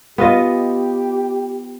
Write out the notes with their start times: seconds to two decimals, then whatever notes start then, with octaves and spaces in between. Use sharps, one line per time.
0.18 B3 F4 G4 D#5